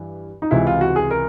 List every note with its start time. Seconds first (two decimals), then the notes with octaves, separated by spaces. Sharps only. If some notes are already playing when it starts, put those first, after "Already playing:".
Already playing: G2 E3
0.42 D#4
0.51 C#2 C3 E3 E4
0.67 F4
0.81 F#4
0.96 G#4
1.11 A#4